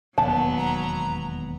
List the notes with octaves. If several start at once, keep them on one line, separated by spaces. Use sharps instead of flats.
E1 D#2 F#3 B3 A5
A#5